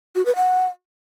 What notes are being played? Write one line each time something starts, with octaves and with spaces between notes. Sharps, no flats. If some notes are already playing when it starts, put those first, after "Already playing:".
F#4
B4
F#5